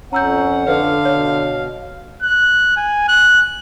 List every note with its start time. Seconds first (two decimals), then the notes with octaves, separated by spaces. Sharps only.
0.13 F2 C#4 F#5 A#5 E6 G6
0.68 D3 B4 F5
1.05 B2 C#5
2.23 F#6
2.76 G#5
3.08 F#6